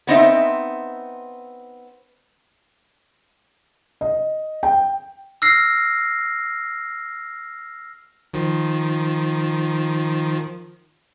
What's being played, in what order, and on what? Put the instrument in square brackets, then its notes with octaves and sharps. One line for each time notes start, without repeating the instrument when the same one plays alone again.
[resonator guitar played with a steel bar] B3 C4 D#4 E5
[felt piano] D#5
G5
[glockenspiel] E6 F6 A#6 C7
[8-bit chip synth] D#3 F3